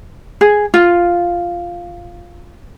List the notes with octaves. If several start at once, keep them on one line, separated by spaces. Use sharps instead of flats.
G#4
F4